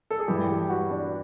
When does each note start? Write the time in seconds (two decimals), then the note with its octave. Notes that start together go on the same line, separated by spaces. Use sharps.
0.10 A4
0.19 G#4
0.28 G2 E3 G4
0.49 G4
0.69 F#4
0.90 D4